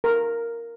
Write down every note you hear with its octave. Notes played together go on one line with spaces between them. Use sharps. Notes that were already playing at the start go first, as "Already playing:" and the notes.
A#4